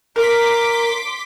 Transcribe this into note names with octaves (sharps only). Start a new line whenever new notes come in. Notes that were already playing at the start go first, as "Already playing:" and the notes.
A#4 C6 D6 B6